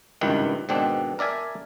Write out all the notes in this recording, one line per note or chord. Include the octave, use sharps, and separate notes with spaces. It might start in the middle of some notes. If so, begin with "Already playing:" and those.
G#1 C#2 G2 D#3 E3
G#2 B2 D#3 C4 D4
A#4 D5 E5 G#5 A5